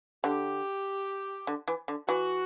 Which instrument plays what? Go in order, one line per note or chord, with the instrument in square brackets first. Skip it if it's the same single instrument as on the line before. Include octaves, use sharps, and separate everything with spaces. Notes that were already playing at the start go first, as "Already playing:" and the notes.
[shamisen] D3 [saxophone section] G4
[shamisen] D3
E3
D3
[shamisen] E3 [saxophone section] F#4